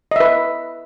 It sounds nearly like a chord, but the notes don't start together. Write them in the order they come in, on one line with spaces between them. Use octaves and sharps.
D#5 E5 B4